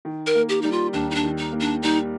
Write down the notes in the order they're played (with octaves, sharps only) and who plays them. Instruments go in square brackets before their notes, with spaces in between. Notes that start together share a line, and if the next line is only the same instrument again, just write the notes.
[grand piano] D#3
[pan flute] A#4
[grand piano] A#3
[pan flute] G4
[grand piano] G3 [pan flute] D#4
[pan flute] F4
[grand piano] D#2 [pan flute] D4
[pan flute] D#4
D4
[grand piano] D#3
[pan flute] D#4
[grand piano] A#3
[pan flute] D4
[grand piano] G3 [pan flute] D#4